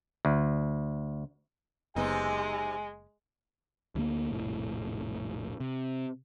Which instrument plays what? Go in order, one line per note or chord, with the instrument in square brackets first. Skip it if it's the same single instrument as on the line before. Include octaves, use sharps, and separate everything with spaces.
[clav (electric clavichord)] D2
[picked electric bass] F#1 B3 [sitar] C3 D#4 [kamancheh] G#3 [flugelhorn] G#5
[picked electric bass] D2 D3 G#3 A#3
F1 A#1 A2
C3